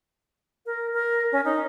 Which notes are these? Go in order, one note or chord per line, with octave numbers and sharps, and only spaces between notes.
A#4
A#4
C#4
D#4